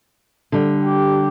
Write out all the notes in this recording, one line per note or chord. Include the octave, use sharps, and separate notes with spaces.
D3 G3
G4